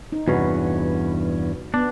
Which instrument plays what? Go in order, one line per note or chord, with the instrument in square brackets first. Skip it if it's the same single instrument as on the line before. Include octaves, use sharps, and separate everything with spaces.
[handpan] D#4
[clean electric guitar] E2 G2 C#4 [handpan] C3 F#4 B4
[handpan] B3 [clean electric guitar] D4